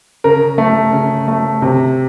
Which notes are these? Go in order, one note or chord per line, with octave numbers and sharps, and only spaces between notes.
C#3 A#4
A3
C#3
A3
C3